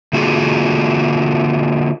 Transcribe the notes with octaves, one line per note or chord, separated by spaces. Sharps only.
D3 A#3 F4 F#4 G#4